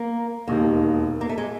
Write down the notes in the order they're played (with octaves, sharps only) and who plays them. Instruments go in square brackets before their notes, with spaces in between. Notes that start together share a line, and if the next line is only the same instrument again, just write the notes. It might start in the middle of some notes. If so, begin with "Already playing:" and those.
Already playing: [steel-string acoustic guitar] A#3
[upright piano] E1 D#2 D#3 [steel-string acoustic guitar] A#3
[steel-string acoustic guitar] A#3
A3
G#3